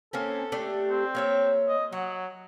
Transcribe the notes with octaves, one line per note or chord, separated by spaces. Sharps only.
A#3 C4 C#4 A4
A3 D4 G4
C4
A#3 C#5 E5
D#5
F#3 F#5